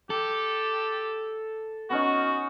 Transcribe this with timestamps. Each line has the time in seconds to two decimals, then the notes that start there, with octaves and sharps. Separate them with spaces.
0.10 G4 A4
1.90 B3 C#4 D#4 F#4